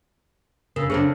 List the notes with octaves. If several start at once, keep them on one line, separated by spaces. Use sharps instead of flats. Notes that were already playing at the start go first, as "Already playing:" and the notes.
C#3 A#4 E6
C#3 C4 D4 G#4 A4 C5